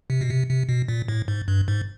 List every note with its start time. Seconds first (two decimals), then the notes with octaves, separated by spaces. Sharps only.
0.10 C3
0.21 B2
0.30 C3
0.50 C3
0.69 B2
0.88 A#2
1.08 A2
1.28 G#2
1.48 G2
1.68 G#2